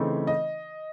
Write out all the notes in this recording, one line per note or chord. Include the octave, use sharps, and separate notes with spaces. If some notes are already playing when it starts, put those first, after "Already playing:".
Already playing: C#3 E3 A3 C4 D#4
D#5